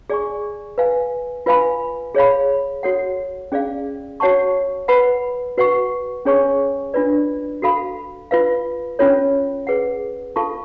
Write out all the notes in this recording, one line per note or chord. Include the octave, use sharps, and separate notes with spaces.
G#4 D5 G#5 C#6
B4 F5 G#5
F4 B4 F5 G#5 B5
G#4 C#5 F5 B5
F#4 A4 C#5 F#5
C#4 G#4 D5 F5
F#4 C#5 F#5 A5 C#6
B4 F#5 B5
F#4 B4 F#5 C#6
C#4 G#4 C#5 G#5 C#6
D4 F4 B4 D5
F#4 A4 F5 B5
F4 B4 F5
C#4 F4 A4 C#5
G#4 B4 F#5
F4 A4 F5 A5 C#6